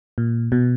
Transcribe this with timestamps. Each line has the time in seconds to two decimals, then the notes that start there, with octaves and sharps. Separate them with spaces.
0.18 A#2
0.52 B2